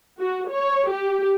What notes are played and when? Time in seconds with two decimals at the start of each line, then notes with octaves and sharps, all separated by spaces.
0.20 F#4
0.51 C#5
0.90 G4